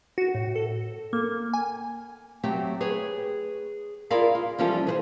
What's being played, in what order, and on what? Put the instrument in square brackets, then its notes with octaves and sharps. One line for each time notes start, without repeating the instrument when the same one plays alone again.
[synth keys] F#4
A2
A4
A#3
G#5
[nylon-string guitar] F#3 A3 C4 G4 G5
G#4 B4 C#5
E4 F4 G#4 A#4 D5 F5
F4
E3 F3 G3 C#4 F4 A4
G#4 B4 C5